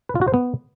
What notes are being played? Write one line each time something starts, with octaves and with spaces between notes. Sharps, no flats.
B4
F4
F#4
C5
B3